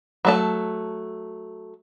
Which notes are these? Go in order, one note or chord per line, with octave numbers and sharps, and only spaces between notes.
F#3 A3 A5